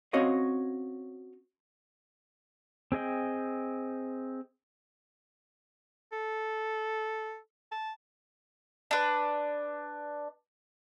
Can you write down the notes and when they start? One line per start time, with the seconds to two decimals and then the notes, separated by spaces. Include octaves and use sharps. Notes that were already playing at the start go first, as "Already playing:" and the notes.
0.13 C4 C#4 F#4 C#5 D#5 F5
2.92 C4 G#4 D#5 G5
6.13 A4
7.72 A5
8.91 D4 B4